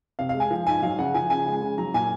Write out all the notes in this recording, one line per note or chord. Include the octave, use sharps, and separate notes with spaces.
C3 F5
F5
G#3
G#5
F3
G#2 G#5
F#3 F5
C#3 F#5
F3 G#5
C#3 G#5
G#3
C#3
F#3 A#5
A#2 G#5